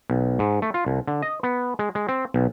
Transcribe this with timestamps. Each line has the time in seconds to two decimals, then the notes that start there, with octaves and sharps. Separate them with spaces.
0.10 B1
0.39 G#2
0.62 A3
0.74 F4
0.86 C2
1.07 D3
1.22 D#5
1.43 B3
1.79 G#3
1.95 G#3
2.09 C4
2.34 B1